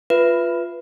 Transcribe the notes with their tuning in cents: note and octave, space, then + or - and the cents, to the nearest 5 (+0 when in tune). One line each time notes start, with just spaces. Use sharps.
F4 +0 B4 +0 E5 +20